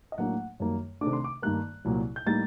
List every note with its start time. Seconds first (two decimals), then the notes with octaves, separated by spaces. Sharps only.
0.12 D#5
0.18 A2 F#3 A#3 D4 F#5
0.60 F#2 D#3 G3 A#3
1.01 C3 D#3 A3 D4 D6
1.13 C6
1.24 D6
1.42 G2 D#3 G3 A#3 F#6
1.85 C2 A#2 F#3 A#3
2.16 G6
2.26 A2 G3 A#3 D#4 A6